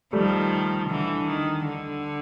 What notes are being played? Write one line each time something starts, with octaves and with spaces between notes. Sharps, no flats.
D#3 F3 G3 A3
D3 E3
D#3
D3